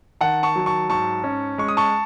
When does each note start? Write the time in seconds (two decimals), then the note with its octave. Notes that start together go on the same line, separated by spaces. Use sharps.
0.21 D#3 F#5 A5
0.43 A5 C#6
0.56 F#3
0.66 A5 C#6
0.89 G#2 A5 C#6
1.24 C#4
1.58 G#3 C#6
1.68 D#6
1.77 A5 C#6